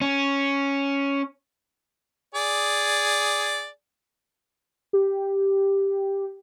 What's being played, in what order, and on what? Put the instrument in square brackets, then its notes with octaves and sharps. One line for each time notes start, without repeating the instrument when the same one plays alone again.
[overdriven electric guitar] C#4
[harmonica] G#4 D5
[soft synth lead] G4